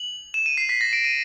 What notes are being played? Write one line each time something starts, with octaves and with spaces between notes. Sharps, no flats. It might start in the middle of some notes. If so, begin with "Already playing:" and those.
Already playing: F#7
E7
D#7
C7
B6
A#6
D7
D#7